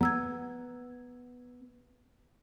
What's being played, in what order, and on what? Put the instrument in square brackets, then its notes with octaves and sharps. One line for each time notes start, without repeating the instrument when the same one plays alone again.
[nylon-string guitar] B3 [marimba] A#5 E6 G#6